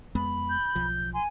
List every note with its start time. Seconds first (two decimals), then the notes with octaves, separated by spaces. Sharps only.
0.15 F2 G#3 B3 B5
0.49 G6
0.75 B1 F3
1.14 G#5 C6